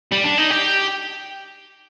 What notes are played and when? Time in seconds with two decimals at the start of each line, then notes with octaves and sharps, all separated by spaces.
0.12 G3
0.24 D4
0.38 D#4
0.50 G4